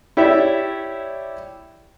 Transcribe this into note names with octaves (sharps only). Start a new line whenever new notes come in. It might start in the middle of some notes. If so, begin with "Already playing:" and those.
E4 G4 C#5 D5 E5